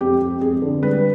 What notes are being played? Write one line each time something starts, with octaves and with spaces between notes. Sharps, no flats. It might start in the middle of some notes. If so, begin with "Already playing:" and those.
F2 G4
F2
F2 G#4
D3
G3 B4